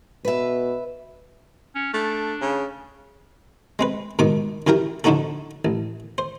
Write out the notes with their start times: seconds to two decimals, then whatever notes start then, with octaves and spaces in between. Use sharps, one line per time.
0.25 B2 B4 E5
1.75 C#4
1.94 A3 D4
2.41 C#3
3.79 G#3 C4 B4
4.19 G#2 B2 D#3 D6
4.67 F#2 E3 G4 A#4 G5
5.04 D3 F3 D4 D#4 F#4 A4
5.65 A1
6.18 C5